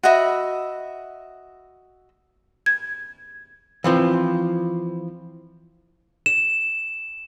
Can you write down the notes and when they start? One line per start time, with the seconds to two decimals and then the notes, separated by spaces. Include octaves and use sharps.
0.03 F#4 D#5 E5 B5
2.66 G#6
3.84 E3 F3 C4
6.26 E7